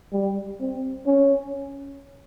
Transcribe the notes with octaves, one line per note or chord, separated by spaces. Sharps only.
G3
C4
C#4